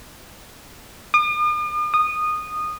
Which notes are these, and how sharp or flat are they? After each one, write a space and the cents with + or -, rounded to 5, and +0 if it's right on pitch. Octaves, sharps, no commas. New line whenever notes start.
D#6 -45
D#6 -20